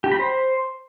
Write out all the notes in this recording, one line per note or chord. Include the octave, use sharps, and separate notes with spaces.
G4
B5
C5